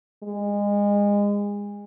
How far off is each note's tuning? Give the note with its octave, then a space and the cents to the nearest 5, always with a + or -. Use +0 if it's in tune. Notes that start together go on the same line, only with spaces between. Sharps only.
G#3 -25